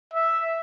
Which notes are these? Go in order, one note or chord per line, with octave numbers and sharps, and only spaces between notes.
E5